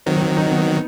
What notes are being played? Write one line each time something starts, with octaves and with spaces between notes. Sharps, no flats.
D#3 F#3 C4
C4
D#4
B3